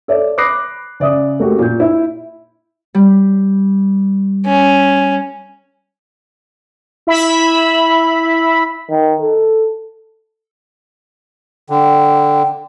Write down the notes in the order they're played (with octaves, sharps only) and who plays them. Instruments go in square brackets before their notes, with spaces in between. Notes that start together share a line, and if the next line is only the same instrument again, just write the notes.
[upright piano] A4 C#5 D5 E5
B5 D6 D#6 F#6 A#6 C7
C#3 D5 E5 D#6
A3 A#3 C4 C#4 F#4 G4
A#2 G6
E4
[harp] G3
[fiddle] C#4
[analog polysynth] E4 E5 B5
[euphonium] D#3
A4
[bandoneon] D3 [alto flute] G5